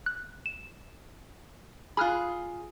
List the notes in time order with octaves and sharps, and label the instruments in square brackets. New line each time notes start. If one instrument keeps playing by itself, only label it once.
[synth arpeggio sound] F#6
E7
[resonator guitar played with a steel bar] F4 G#4 [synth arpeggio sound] B5 F6 F#6